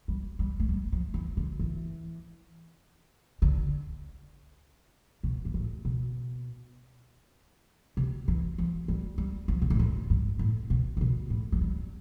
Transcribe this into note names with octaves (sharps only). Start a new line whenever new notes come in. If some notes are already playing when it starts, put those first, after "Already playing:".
G3
G3
A3
G3
F3
E3
D3
E3
D3
B2
G2
A2
B2
C3
E3
F3
G3
G3
F3
B2
A2
G2
G2
A2
B2
A2
B2
A2
F3
G3